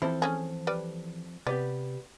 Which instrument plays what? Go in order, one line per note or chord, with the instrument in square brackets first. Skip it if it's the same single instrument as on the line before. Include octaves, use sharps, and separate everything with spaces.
[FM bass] E3 [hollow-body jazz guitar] F3 C4 A4 [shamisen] E4
[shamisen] A3 C#4 G#4
G3 B4 D5
[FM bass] C3 [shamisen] B3 [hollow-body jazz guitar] G4 B4 D5